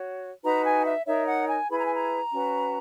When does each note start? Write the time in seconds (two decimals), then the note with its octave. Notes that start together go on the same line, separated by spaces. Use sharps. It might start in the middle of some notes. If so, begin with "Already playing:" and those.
Already playing: F#4 C#5
0.43 D#4 F#4 B4 A#5
0.64 G#5
0.85 E5
1.06 D#4 A#4 C#5 E5
1.27 F#5
1.48 G#5
1.70 E4 G#4 B4 B5
1.78 A#5
1.85 G#5
1.94 A#5
2.33 C#4 F#4 B4